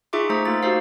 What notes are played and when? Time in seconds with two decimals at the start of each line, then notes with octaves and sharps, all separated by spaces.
0.13 D#4 F4 G#4 E5 C#6 D6
0.30 A3 D#4 C5 A#5 B6
0.45 A3 A#3 F4 A6
0.63 D#4 F#4 G4 C5 F5